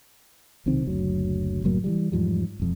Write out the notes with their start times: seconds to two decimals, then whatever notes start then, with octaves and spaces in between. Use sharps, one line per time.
0.66 B1 C3 D#3 C4
0.86 F#1 D2 F#3
1.64 F#1 A2 F#3 A#3
1.84 E3 F3 G3
2.12 E2 G#2 F3 G3
2.60 E1 F2